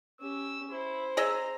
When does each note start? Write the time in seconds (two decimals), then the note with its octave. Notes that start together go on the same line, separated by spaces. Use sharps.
0.20 C#4 G4 E6
0.71 E4 C5
1.17 G#4 D#5 E5 A#5